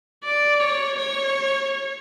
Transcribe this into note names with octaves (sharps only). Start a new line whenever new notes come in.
D5
C#5
C#5